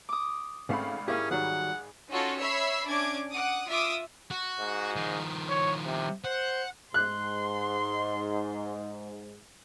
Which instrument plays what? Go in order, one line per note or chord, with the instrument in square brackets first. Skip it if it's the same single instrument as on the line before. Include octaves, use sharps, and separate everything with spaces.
[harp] D6 D#6
[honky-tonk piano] G#1 F5 B5 [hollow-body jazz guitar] C#3 A3 C4
[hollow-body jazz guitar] A#3 E4 G4 [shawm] C#4 [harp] G#4
[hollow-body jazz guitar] D#3 F#3 G3 [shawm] F#5
[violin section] C#4 D#4 F4 F#4 A4 C#5
C#5 E5 B5 E6 C7
C#4 D4 D6 G#6
F#5 D6 D#6
F4 E5 D6 D#6
[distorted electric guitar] F#4
[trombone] G#2
[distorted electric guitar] D#3 F3
[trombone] C#5
C3
[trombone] C5 [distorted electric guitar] F#5
[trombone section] G#2 [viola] C6 [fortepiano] F#6